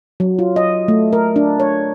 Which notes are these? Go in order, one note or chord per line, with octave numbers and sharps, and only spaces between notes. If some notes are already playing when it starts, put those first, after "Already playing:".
F#3
F4
D#5
A3
A#4
D4
C#5